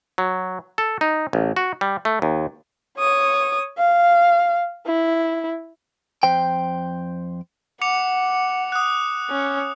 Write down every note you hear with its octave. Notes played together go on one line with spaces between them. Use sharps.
F#3
A4
D#4
A1
F#4
G3
A3
D#2
C#5 D#6
F5
E4
F2 C5 G5
F#5 D6 C#7 F7
D#6 F#6
C#4